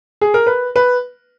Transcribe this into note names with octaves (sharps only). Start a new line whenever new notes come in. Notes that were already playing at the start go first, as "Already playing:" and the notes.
G#4
A#4
B4
B4